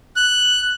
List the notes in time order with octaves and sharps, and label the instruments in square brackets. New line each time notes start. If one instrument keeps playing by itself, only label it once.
[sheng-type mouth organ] F#6